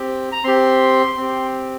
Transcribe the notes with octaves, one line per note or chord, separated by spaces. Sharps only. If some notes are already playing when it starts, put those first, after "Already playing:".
Already playing: C4 G4
A#5
C4 G4 C6
C4 G4